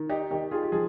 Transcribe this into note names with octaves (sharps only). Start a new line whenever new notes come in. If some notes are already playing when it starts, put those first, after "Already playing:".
Already playing: D#3
D#4 G4
D#3 D#4 G4
F4 G#4
G4
F3 F4 G#4